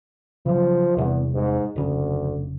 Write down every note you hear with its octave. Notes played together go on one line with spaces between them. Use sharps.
C#3 F3 F#3
E1 E2 C3 G3
G#2
F1 D2 C#3